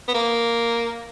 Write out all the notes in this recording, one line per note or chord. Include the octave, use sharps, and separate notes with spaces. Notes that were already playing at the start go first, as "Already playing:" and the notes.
B3
A#3